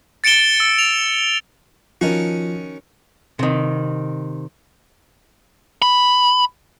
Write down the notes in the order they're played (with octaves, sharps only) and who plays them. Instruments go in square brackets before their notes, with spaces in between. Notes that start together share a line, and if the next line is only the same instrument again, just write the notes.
[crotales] A6 C#7 D7 E7 G7
E6
F7
[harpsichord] D#3 C#4 F#4 [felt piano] F3
[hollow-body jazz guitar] C3 D#3
[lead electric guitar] B5